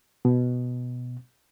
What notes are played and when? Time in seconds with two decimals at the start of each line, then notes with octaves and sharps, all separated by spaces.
0.25 B2